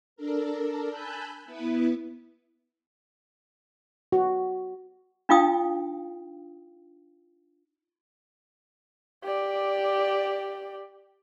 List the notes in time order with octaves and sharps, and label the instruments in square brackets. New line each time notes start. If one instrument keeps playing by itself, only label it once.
[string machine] D4 A4 A#4
G#5 A5 B5 E6 F#6 G6
B3 E4 B4
[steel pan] F#4
[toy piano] D4 D#4 F4 F5 G5 D#6
[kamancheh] G4 D5